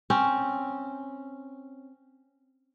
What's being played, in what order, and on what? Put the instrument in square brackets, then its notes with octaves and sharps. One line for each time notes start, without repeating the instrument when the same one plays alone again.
[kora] C4 C#4